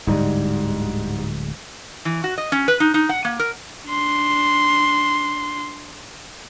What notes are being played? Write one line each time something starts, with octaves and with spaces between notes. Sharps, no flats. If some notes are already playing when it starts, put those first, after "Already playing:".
D1 G#2 D3 G3 G#3
E3
F#4
D#5
C#4
B4
D#4
D#4
F#5
A#3
A#4
D4 C6